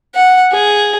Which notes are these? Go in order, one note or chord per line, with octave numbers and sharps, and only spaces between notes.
F#5
G#4